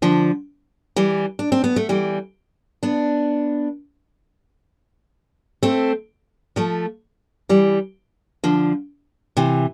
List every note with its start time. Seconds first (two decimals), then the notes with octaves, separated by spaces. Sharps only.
0.02 D3 F3
0.96 E3 G3
1.39 D4
1.52 C4
1.64 B3
1.76 A3
1.89 E3 G3
2.83 B3 D4
5.63 A3 C4
6.56 F3 A3
7.49 E3 G3
8.44 D3 F3
9.37 C3 E3